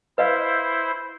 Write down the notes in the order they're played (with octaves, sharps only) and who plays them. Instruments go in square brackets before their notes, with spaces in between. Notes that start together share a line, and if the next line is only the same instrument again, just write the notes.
[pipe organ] E4 C5 [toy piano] B4 D#5 F5